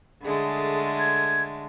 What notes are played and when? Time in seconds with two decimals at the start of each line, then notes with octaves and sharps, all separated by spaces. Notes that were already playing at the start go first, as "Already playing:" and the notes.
0.24 D3 G#3 A3 G#4
0.99 G#6